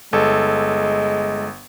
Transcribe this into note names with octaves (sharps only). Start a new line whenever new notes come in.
G1 G#3 A4